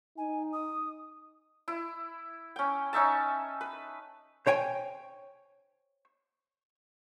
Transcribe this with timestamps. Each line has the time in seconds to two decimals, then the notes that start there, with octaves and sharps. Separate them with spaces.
0.18 D#4 G#5
0.53 D#6
1.68 E4
2.56 C#4 G5
2.93 C#4 D#4 E5 A5
3.61 B4
4.47 C5 C#5 G5 G#5